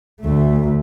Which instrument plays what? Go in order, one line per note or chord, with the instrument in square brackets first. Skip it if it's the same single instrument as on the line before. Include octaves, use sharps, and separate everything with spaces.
[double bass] D2 A3